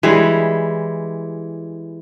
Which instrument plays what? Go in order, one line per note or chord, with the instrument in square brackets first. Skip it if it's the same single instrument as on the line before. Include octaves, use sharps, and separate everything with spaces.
[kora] E3 G3 G#3